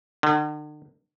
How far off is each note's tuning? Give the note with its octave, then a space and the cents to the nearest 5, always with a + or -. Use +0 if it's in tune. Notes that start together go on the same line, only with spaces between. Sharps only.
D3 +45